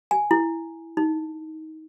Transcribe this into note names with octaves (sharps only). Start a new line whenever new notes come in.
G#5
E4
D#4